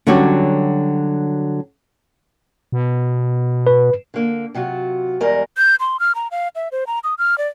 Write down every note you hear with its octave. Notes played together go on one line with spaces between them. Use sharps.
D3 F#3 G3 C#4 F#4 G4
B2
B4
D3 A#3
C3 F#3 F4 F#4
E2 G3 G#3 A#4 D#5
G6
C6
F6
A#5
F5
E5
C5
A#5
D#6
F6
D5